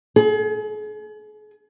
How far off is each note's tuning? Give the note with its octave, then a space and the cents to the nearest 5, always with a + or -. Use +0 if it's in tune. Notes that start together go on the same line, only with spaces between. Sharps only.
G#4 +40